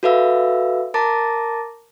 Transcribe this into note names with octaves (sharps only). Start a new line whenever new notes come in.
F#4 A4 B4 E5 F5 E6
A#4 A5 A#5 D6 A6 A#6